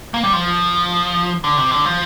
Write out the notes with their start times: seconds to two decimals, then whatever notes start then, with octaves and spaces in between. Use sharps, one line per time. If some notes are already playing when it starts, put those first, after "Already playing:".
0.14 A#3
0.23 G3
0.33 F3
1.44 D3
1.57 C3
1.71 D3
1.85 F3